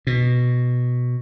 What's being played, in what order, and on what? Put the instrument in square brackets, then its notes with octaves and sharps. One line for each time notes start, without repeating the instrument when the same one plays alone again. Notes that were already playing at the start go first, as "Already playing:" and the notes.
[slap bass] B2